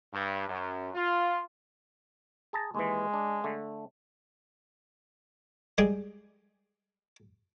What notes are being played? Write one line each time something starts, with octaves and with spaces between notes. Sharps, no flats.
G2
F#2
F4
G#4 A5 A#5
D#2 E3 G#3
D4
D3 A3
G3 G#3 G4 G#4